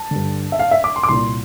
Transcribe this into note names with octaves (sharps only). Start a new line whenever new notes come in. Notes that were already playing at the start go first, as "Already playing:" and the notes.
Already playing: A5
G2 D3
E5
F5
E5
D6
C6
D6
C2 A#2 C6